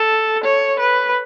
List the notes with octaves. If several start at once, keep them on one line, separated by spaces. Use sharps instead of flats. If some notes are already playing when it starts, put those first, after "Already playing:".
Already playing: A4
C#5
B4